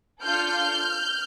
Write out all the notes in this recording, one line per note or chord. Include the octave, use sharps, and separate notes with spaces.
D4 F4 A4 F6 G6